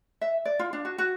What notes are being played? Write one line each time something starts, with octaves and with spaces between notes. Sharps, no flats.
E5
D5
F4
D4
F#4
F#4